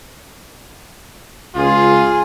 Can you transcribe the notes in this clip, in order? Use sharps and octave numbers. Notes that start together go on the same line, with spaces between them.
C#2 F4 G#4